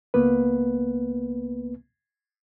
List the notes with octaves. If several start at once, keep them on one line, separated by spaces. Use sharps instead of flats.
C#2 A#3 B3 B4